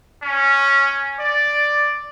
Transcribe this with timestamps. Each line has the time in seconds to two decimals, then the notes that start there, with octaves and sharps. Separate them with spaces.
0.22 C#4
1.17 D5